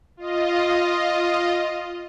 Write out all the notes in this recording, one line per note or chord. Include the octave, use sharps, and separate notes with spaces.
F4 D#5